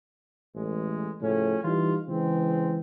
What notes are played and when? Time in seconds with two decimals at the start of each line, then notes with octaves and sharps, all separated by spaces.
0.55 A1 G#3
1.21 A2 C#3 F3 C#4
1.64 E3 G3 D#4 F4
2.08 C#3 E3 G#3 C4